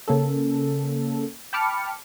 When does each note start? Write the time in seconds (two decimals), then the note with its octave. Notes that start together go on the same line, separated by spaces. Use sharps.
0.08 C#3 A#3 C#4 A4
1.53 G5 A5 B5 D6 F6 C#7